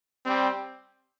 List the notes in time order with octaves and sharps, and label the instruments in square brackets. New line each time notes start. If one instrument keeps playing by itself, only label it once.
[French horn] G3 [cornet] C4